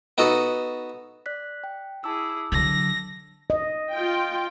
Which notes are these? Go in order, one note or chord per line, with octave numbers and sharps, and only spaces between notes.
B3 D#4 F#4 A4
D5 F#6 B6
G5
E4 G#4 A5 D6 E6
D3 F#3 A#6
D#5
F4 G5